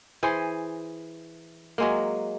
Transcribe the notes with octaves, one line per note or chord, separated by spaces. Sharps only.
E3 G#4 C5
F#3 G#3 A#3